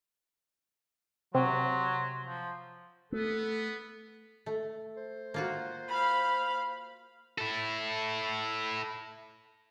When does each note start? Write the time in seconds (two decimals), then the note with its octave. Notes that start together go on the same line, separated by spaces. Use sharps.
1.35 C3 F#3 C6
2.24 F3
3.12 A3 B3 A4
4.46 A3
4.97 C5
5.34 A#3 F4 F#4
5.88 F5 B5
7.38 E4 A4